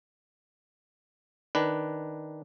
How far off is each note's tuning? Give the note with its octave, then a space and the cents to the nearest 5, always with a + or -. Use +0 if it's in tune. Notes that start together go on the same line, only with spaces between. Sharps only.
D#3 +0 D4 +0 B4 +0